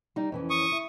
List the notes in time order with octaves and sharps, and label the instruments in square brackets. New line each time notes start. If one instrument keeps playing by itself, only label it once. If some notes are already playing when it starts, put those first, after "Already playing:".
[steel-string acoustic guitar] G3 D#4
F2 E3 C#4
[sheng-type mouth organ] C#6 D#6
[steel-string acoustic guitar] E4